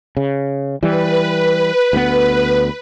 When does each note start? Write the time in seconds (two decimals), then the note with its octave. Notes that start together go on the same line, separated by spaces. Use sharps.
0.17 C#3
0.83 E3 G3 B4
1.93 D2 B3